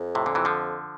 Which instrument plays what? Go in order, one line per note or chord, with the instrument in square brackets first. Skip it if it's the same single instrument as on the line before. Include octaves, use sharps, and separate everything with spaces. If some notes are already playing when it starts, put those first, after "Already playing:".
Already playing: [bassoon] F2
[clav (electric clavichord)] A2 C3
A#2 D3
C3 E3
D3 F3